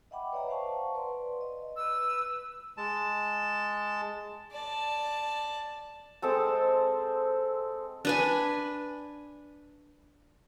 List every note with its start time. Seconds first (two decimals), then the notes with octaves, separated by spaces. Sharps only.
0.11 D#5 E5 F#5 G5 B5 D6
0.33 B4 C#5 D5 E5 G5 A#5
0.48 C5 D5 F5 F#5 A5 C#6
0.95 B4 D5 C6
1.41 D#5
1.76 B4 E6
2.77 G#3 A5
4.52 D5 A5
6.22 G#3 C4 A4 A5
8.05 D4 B4 G#5